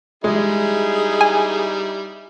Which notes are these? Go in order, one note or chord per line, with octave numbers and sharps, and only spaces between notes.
G3 G#3 D#4 E4 G#4
G#5